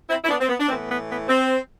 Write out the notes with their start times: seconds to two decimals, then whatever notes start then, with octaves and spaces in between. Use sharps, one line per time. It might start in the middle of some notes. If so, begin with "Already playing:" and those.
0.10 C4 E4
0.24 E4
0.29 B3 D4
0.41 C4
0.49 B3
0.60 D4
0.68 A2 E3 B3 C4
0.89 B3
1.09 B3
1.28 C4